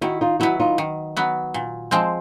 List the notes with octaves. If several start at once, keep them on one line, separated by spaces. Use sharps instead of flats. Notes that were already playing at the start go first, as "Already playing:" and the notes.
D#3 E4 F#4
D#4 F4
F#3 B3 E4 F#4
D#4 F4
D#3
F#3 B3
A#2
F3 G#3 C4